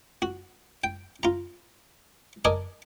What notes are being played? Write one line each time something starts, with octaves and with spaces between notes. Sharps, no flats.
F#4
G5
F4 A#5
A#4 D5 D#5 G#5 A5